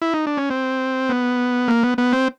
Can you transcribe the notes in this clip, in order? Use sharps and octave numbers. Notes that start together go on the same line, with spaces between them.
E4
D#4
D4
C#4
C4
B3
A#3
B3
B3
C4